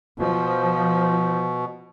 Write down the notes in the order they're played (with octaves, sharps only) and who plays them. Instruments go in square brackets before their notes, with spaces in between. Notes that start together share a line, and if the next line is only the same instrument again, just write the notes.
[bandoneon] B2 [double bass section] F3